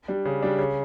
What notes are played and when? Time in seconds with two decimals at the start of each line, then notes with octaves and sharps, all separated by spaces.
0.08 G3 D4
0.25 C#3
0.42 G3 D4
0.59 C#3